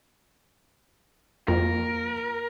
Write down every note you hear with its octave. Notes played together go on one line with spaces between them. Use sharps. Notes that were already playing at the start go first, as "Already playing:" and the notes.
F2 A#3 F4 A#4